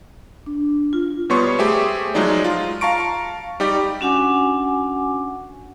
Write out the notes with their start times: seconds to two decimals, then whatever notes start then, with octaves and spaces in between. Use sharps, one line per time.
0.46 D4
0.93 F4
1.30 B2 G3 B3 C#5 C6 C#6
1.59 A3 G4 G#4 C5 E5
2.14 F3 F#3 G#3 D#4 D5
2.44 F4
2.81 F5 A5 A#5 C#6 D7
3.60 G3 D#4 G4 D5
4.01 C#4 D4 F#4 F#5 G#5 D6